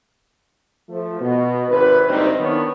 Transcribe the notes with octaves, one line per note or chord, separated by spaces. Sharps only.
F3 A3
B2
G#1 G#2 C3 B4
F#1 G2 C3 G3 C4 D#4
D#3 B3 D4 E4 A#4 C#5